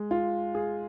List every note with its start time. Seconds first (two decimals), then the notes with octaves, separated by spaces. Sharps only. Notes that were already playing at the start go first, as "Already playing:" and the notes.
Already playing: G#3
0.11 F4
0.55 G#4